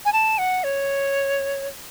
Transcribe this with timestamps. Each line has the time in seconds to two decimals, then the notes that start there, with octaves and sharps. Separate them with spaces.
0.05 G#5
0.13 A5
0.38 F#5
0.64 C#5